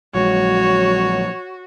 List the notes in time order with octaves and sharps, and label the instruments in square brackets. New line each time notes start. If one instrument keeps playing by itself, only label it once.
[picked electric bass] A#1 G#3 [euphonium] F#3 [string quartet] F#4 [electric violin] C#5